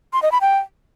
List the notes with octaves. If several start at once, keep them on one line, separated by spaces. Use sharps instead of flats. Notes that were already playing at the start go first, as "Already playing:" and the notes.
C6
D#5
B5
G5